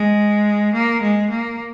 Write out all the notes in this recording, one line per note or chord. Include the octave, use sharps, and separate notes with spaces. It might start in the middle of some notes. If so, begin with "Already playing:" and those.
Already playing: G#3
A#3
G#3
A#3